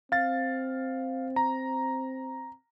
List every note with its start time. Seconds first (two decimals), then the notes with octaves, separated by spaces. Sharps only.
0.12 C4 F5 A6
1.36 A#5